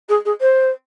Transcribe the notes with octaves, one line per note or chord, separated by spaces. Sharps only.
G#4
G#4
C5